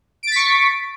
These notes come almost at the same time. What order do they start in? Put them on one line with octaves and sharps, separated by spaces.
D7 A6 B6 C#6